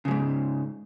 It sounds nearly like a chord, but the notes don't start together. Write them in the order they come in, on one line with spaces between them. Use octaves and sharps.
C#3 F2 G#2